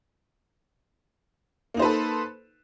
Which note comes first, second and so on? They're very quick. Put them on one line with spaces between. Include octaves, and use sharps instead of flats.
A#3 D#4 C5 B4 A4